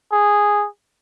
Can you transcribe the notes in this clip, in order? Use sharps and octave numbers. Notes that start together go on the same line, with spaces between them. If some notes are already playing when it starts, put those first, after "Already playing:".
G#4